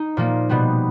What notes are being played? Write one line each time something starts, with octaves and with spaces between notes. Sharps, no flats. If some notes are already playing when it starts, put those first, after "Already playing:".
Already playing: D#4
A#2 F3 A#3
B2 G3 B3